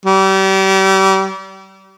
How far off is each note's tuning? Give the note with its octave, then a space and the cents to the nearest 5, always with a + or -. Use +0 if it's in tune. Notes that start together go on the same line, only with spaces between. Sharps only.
G3 -35